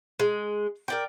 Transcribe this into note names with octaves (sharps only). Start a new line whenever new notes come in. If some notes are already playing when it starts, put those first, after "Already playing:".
G#3
A#4 D5 G5